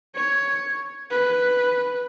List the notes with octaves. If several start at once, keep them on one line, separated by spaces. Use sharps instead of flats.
C#5
B4